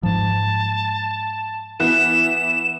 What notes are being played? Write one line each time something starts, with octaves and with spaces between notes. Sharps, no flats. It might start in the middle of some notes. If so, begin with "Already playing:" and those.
G#2 F3 A5
E3 B3 F#6 E7